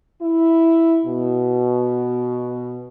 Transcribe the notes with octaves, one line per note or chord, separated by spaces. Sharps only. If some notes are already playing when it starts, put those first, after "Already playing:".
E4
B2